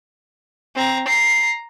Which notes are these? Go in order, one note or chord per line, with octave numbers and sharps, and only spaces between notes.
C4 A#5
A#5 C7